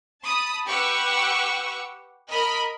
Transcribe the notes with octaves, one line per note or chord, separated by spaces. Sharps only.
A5 B5 D#6
G4 B4 F#5 C#6 E6
A#4 D#5 B5